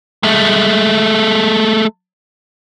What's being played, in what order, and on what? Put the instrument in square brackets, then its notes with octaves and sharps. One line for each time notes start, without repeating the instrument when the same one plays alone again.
[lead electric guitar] G#3 A3